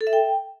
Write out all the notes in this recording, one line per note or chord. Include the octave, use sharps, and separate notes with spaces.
A4
E5
G5